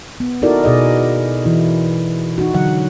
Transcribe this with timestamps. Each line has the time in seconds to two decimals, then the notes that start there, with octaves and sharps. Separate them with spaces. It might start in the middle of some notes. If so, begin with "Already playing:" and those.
0.20 B3
0.42 D#4 E4 F#4 A4 A#4 D5
0.64 B2 G#4 D5 D#5
1.45 E3 E4
2.38 D#4 F#4
2.53 D3 F#3 F#5